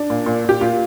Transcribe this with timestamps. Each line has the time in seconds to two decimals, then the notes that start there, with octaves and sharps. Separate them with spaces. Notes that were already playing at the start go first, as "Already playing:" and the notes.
Already playing: D4
0.10 A#2
0.26 A#2
0.45 A#2 G4
0.61 A#2 F4